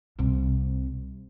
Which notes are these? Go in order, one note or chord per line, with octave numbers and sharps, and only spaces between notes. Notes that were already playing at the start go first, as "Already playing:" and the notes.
C2 C3